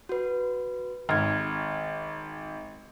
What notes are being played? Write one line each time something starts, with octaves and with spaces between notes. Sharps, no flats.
F#4 B4
G#1 F6 G#6